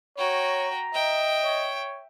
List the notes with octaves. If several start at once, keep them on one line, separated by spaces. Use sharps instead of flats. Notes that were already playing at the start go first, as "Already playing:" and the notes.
F#4 C#5 G5 A#5
D#5 E5 G5
C#5